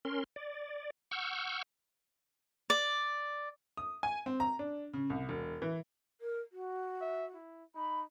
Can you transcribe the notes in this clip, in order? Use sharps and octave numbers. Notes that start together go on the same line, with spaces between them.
C#4 A#4 C6
D5
F#5 C#6 E6 F6 G6
D5
D#6
G#5
C4
A#5
D4
C#3
C2
E1
E3
A#4
F#4
E5
E4
D#4 B5